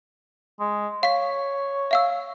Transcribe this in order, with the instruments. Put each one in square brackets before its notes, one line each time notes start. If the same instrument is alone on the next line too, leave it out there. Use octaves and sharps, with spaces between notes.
[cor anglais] G#3
[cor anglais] C#5 [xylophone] F5 B6
[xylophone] E5 F5 E6